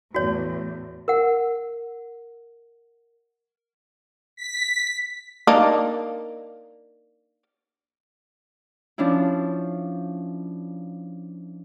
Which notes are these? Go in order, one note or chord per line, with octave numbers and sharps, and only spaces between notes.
E2 A2 F#4 C#5
A#4 F#5
B6
A#3 D4 D#4
F3 C#4 D4 E4